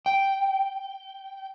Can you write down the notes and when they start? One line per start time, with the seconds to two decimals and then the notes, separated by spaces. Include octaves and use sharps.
0.06 G5